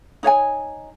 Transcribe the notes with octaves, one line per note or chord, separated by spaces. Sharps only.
D#4 C#5 F5 G#5